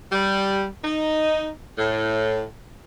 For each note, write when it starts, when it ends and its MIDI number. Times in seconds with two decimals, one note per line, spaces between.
0.12 0.65 55
0.83 1.47 63
1.78 2.42 45